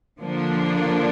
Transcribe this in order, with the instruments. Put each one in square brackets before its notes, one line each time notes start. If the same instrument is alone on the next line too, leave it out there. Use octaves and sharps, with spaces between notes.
[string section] D3 F3 A#3 D4